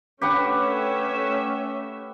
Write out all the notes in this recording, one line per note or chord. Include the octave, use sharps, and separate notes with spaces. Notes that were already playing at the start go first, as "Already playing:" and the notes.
A3 C#4 G4 B4 E5 F#5